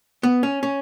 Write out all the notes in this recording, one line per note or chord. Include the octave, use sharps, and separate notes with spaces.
B3
C#4
C#4